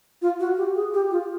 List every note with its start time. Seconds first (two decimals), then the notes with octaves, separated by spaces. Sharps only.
0.22 F4
0.40 F#4
0.57 G4
0.76 G#4
0.93 G4
1.11 F4